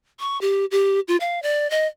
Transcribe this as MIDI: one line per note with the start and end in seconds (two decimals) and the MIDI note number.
0.20 0.40 85
0.41 0.65 67
0.71 1.00 67
1.08 1.17 65
1.20 1.42 77
1.43 1.70 74
1.70 1.86 75